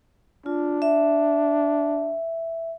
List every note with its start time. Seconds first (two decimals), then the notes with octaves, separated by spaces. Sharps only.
0.46 D4 F4
0.82 E5